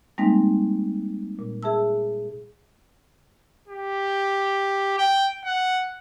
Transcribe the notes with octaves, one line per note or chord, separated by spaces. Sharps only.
G3 G#3 A#3 C4 D#4
A#2
G#4 E5 A5 E6
G4
G5
F#5